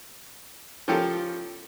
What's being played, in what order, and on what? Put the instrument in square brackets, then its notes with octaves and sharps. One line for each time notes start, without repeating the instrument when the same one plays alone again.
[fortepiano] F3 C#4 F4 G4 A4 A#4